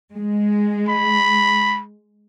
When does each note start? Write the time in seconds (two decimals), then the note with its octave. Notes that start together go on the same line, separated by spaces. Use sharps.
0.15 G#3
0.88 B5